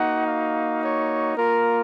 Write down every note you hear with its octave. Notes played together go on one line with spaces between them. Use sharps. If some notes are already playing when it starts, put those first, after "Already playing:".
Already playing: A#3 D#4 F#4 F#5
F5
C#5
A#3 F4 A#4